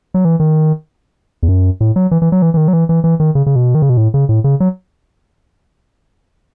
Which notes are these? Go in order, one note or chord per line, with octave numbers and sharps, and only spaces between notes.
F#3
E3
D#3
E2
F#2
A2
F#3
E3
E3
F#3
E3
E3
D#3
F#3
E3
E3
E3
D#3
C#3
C#3
B2
D#3
C#3
B2
A2
C#3
A2
C#3
F#3